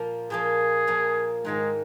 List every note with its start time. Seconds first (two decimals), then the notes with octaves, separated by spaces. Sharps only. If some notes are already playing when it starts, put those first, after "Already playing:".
Already playing: A#2 F3 A#3
0.30 A#2 F3 A#3 G#4
0.87 A#2 F3 A#3
1.45 G#2 D#3 G#3 A#3 D#4